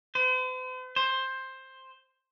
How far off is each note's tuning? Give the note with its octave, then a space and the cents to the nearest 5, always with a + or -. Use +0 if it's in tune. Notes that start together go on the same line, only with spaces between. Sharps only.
C5 -45
C5 +10